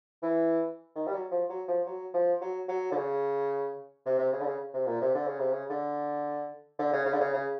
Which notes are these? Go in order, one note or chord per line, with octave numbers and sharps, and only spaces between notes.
E3
D#3
G3
F#3
F3
F#3
F3
F#3
F3
F#3
F#3
D3
C#3
C3
C3
C#3
D3
C#3
C3
A#2
C3
D3
C#3
C3
C#3
D3
D3
C#3
C#3
D3
C#3
C#3